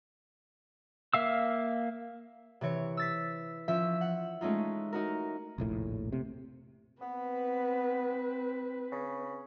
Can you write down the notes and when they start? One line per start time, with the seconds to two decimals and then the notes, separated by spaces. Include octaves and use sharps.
1.14 A#3 E5 F5 E6
2.61 C3 E3 C#5 D7
2.97 E6 A6 B6
3.68 F3 C#4 E5 E6
4.01 F#5
4.41 G#3 A3 C#4 D#4 F4
4.93 D#4 F#4 A#4
5.58 F1 A#1 A2
6.13 C3
7.02 B3 C4 B4
8.92 C#3